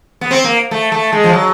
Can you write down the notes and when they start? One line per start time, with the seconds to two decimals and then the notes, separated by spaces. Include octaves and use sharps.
0.21 B3
0.31 C4
0.44 A#3
0.71 A3
0.92 A3
1.13 G#3
1.24 F3
1.33 F#3